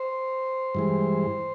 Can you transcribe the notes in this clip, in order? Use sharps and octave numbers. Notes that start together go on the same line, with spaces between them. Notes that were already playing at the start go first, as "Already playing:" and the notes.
Already playing: C5
G2 E3 G#3